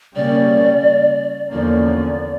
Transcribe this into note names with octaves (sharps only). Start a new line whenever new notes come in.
C#3 G3 A#3 C#4 D5
E2 D3 F3 A#3 C#4 D5